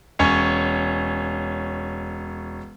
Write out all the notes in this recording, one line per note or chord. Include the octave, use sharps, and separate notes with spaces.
E1 C#4 C#5 G#5